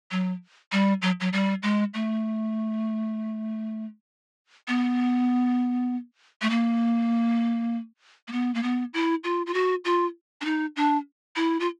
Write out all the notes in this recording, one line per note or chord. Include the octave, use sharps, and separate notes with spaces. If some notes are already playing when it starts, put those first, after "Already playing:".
F#3
G3
F#3
F#3
G3
G#3
A3
B3
A3
A#3
A#3
B3
A#3
B3
E4
F4
F4
F#4
F4
D4
D#4
D4
E4
F4